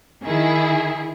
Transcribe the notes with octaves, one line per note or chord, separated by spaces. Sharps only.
D#3 E4 G#4